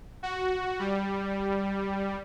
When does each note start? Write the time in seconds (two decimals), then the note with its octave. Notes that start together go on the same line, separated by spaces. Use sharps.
0.23 F#4
0.79 G3